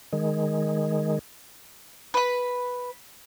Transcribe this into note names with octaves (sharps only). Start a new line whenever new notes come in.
D#3 G#3
B4 B5